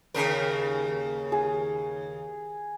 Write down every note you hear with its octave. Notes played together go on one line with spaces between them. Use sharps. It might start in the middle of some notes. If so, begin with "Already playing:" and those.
D#2 C#3 A#4
G#4